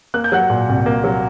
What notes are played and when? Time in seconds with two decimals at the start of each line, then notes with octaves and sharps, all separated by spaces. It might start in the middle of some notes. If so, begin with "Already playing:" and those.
0.14 A#3 F#6
0.24 G6
0.32 F#3 F#5 F#6
0.50 A#2
0.69 C2
0.86 A#3
1.04 F#3